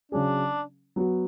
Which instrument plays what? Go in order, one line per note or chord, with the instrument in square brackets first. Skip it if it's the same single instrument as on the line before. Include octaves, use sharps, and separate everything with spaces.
[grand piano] C#3 F#3 C#4 G#4 [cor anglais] D4
[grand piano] F#3 B3 F#4